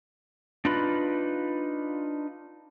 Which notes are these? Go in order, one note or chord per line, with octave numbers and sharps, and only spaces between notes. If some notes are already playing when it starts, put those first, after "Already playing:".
D4 D#4 F4 B4 B5